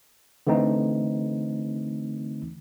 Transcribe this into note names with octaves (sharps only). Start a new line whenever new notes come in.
D3 E3 A3 C4 D#4